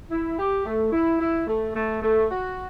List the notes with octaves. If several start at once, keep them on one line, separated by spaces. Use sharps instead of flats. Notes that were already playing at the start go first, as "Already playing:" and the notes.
E4
G4
A3
E4
E4
A3
A3
A3
F#4